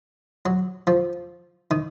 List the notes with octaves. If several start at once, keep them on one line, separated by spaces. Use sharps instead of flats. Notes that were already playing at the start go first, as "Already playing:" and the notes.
F#3
F3
D#3